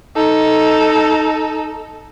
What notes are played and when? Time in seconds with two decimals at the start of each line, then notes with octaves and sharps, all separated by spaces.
0.16 D#4 A4